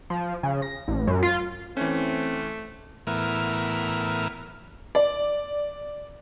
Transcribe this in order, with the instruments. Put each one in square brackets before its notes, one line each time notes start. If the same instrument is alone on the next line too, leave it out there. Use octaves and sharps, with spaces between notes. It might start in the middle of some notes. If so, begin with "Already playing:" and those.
[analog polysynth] F3
C#3
A#6
A1
F#2
F4
[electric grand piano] E3 C#4 [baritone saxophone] A3 [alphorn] C4
[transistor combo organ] A2 E3 B3 A#4 E5 F6
[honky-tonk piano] D5